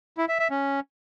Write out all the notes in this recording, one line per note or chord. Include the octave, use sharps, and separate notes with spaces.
E4
E5
E5
C#4